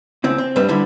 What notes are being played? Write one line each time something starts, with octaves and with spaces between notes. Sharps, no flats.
C#2 C4 E4
C4
G2 G3 B4 E5
D3 G3 E4